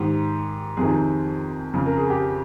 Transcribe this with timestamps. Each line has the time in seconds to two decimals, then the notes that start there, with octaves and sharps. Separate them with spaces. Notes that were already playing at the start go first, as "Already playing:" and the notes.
Already playing: G#2 D#3 G4
0.77 F2 C3 D#3 G#4
1.74 F2 C#3
1.86 A#4
1.97 G#4
2.10 G4